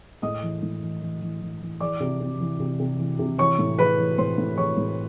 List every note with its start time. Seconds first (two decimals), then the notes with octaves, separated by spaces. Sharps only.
0.22 A2 D#5 D#6
0.43 E3
0.62 A2
0.82 E3
1.01 E3
1.22 E3
1.41 E3
1.61 E3
1.81 E3 D5 D6
2.01 C3
2.21 C3
2.40 E3
2.60 C3
2.80 C3
2.99 E3
3.19 C3
3.38 E3 C#5 C#6
3.59 A2
3.78 E3 B4 B5
3.98 E3
4.18 A2 C5 C6
4.38 A2
4.57 E3 C#5 C#6
4.77 A2